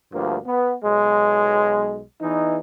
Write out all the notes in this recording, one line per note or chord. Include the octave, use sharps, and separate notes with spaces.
D2 G2 F3 A#3
B3
B1 G#3
E2 E3 D#4